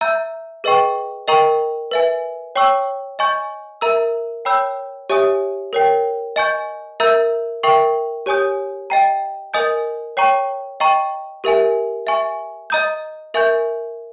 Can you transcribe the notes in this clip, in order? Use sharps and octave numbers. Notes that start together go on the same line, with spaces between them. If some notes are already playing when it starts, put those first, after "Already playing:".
E5 A#5 E6 G6
G#4 B4 D#5 G5 C#6
A#4 D#5 G5 A#5 C#6
B4 E5 G#5
C#5 G5 C#6 E6
D#5 G#5 C#6 G6
A#4 E5 A#5 E6
C#5 G5 B5 E6 G6
G4 C#5 E5 G#5 D#6
A#4 C#5 G5
D#5 G#5 C#6 G6
A#4 E5 A#5 E6 G6
A#4 E5 G5 C#6
G4 C#5 G#5 D#6 G6
D#5 G5 A#5
A#4 D#5 G#5 D#6 G6
C#5 G5 A#5 C#6
D#5 G5 A#5 C#6
G4 A#4 E5 G#5
E5 G#5 C#6
D#5 A#5 D#6 G6
A#4 E5 G#5 C#6 G6